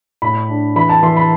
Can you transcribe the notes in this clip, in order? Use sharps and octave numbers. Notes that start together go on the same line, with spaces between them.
A2 B5
D4
E3 B5
A5
E3 C6
B5